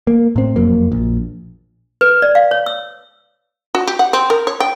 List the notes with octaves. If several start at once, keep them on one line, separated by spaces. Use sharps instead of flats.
A#3
A2 C4
F#1 F2 F#3 A#3
A#1
B4
D5
F5
C#5
E6
F#4
G4
F#5
C4
A#4
C#5
G5